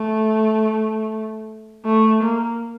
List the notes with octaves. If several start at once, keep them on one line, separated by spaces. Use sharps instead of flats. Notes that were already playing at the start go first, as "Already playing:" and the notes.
Already playing: A3
A3
A#3